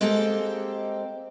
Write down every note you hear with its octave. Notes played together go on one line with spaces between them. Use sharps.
G#3 A#3 C4 G4 A4 G5